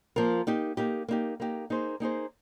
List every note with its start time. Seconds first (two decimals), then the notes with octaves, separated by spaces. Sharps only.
0.16 F3 A#3 F4 A#4
0.47 A#3 D#4 G4
0.77 A#3 D#4 G4
1.08 A#3 D#4 G4
1.40 A#3 D#4 G4
1.70 A#3 D#4 G#4 C5
2.00 A#3 D#4 G#4 C5